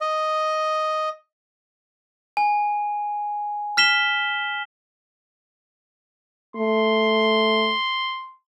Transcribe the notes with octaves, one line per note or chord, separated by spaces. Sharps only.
D#5
G#5
F6 B6 E7 G7
A3 C6